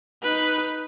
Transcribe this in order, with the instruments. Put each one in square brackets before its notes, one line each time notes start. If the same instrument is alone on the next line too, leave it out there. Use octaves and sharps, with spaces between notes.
[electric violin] D#4 B4